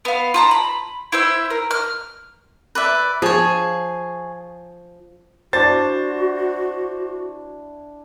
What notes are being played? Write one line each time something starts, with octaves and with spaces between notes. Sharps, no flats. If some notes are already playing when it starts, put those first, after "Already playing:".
B3 F5
F4 A5 A#5
B5
E4 C5 E5
A#4
F6
B4 D5 E5
F3 G#4 C#5
D4 E4 F#4 C5 A6